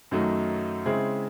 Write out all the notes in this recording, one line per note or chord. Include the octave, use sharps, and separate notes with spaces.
F#2 D#3 F#3 A3 D#4
C#3 G#3 C4 E4 G#4